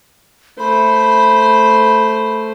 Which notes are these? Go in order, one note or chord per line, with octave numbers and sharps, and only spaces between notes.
A3 C5 B5